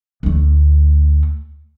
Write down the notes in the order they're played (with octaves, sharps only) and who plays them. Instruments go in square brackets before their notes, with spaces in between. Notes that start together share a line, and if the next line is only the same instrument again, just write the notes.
[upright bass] D2 A3